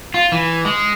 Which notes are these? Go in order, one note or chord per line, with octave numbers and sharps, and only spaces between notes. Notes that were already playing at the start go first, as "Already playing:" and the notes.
F4
E3
G#3